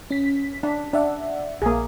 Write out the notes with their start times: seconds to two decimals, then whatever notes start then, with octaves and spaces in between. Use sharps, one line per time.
0.11 C#4 B6
0.63 D4
0.93 D4 D5 E5 F#5
1.62 A#1 A#3 G#4